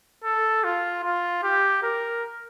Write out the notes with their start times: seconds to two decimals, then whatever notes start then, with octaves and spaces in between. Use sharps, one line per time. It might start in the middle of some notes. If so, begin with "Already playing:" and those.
0.24 A4
0.64 F4
1.04 F4
1.43 G4
1.83 A#4